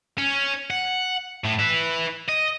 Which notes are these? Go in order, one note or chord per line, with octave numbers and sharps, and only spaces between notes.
C#4
F#5
A2
B4 E5
D#5